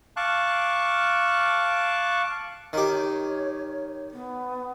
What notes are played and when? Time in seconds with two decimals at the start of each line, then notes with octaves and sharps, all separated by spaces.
0.17 F5 A5 C#6 D6 F#6
2.73 D#3 G4 C#5
4.13 B3